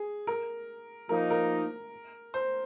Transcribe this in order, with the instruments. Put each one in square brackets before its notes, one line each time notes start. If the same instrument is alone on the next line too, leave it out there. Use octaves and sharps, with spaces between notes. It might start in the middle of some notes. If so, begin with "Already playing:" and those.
Already playing: [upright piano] G#4
A#4
[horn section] F3 A#3 D#4 [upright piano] A#4
[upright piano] A#4
C5